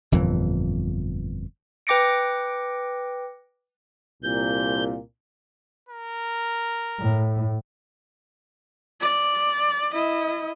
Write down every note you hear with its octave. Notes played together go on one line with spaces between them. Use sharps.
G1 F2 A#2 E3
B4 G5 D6 A#6 C#7 D7
C2 A#2 G6
A#4
A2
D5
E4 D#5